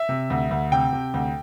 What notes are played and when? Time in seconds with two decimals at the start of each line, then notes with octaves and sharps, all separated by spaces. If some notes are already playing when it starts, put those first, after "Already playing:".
Already playing: E5
0.09 C3
0.30 D2
0.51 D2
0.72 C3 G5
0.93 C3
1.14 D2